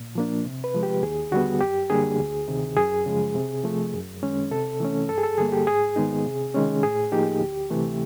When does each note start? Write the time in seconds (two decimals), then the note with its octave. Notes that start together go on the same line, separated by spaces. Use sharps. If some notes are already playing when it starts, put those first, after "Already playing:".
Already playing: A#2
0.15 F3 A#3 D4
0.45 C3
0.64 B4
0.74 F3 G#3
0.83 G4
1.03 D#2 G#4
1.32 D3 G3 B3 F#4
1.61 F#2 G4
1.90 D3 G3 A#3 D4 G#4
2.19 D2
2.48 C3 D#3
2.77 F#2 G#4
3.06 C#3 F3 G#3
3.35 C3
3.64 F3 A3
3.93 F#2
4.22 D#3 G#3 C#4
4.51 C3 A4
4.80 E3 A3 C#4
5.09 G2 A4
5.18 G#4
5.23 A4
5.38 D3 G3 A#3 G#4
5.52 G4
5.67 G#2 G#4
5.96 D#3 G#3 B3 D#4
6.26 C3
6.54 D#3 G#3 C#4
6.83 A2 G#4
7.12 F3 A#3 D#4 G4
7.41 D2
7.70 C3 E3 A3